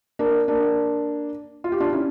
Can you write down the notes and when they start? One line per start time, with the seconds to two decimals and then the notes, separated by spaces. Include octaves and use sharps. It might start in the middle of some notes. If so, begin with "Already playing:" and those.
0.19 A#3 D4
0.48 A#3 D4
1.64 F4
1.72 G4
1.80 D4 F4
1.93 C#4 E4